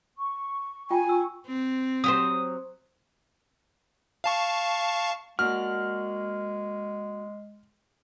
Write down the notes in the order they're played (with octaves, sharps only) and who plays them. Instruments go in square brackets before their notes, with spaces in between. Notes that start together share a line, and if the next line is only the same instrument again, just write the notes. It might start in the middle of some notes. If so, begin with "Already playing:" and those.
[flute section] C#6
[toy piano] F4 G5 [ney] G#5
[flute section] C#6 [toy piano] E6
[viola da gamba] C4
[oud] F#3 G4 C5 [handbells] D#6
[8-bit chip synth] F5 A5 C#6
[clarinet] G#3 [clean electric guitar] A#3 D4 F#4 [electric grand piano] F6